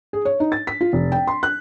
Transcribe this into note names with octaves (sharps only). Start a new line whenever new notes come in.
G#4
C#5
D#4
A6
B6
F4
F1
G5
C6
F#6